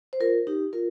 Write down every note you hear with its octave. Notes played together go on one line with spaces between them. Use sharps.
C5
F4 A#4
D#4 G4
F4 A#4